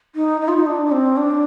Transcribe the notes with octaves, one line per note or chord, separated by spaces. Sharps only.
D#4
D#4
F4
D#4
D4
D4
C4
D4